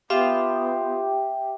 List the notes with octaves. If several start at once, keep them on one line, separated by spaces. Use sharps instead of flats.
B3 F4 G4 E5